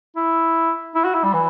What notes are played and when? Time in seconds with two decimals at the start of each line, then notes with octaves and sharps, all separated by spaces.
0.16 E4
0.95 E4
1.05 F#4
1.14 E4
1.24 G3
1.33 E3